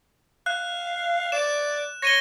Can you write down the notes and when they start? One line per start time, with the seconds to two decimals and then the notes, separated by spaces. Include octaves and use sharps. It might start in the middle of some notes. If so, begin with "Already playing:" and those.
0.46 F5 F#6
1.32 D5 E7
2.02 C#5 A#6 D#7 G7